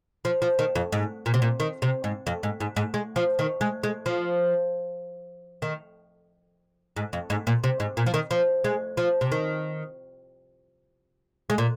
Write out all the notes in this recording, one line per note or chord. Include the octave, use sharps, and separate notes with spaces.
F3
F3
D#3
F2
G#2
A#2
C3
A#2
D#3
C3
G#2
F2
G#2
G#2
G#2
G#3
F3
D#3
G#3
G#3
F3
D#3
G#2
F2
G#2
A#2
C3
G#2
A#2
F3
D#3
F3
G#3
F3
C3
D#3
G#3
A#2